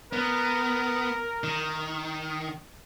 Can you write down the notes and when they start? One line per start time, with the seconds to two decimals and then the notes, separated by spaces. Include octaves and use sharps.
0.13 B3 A#4
1.44 D#3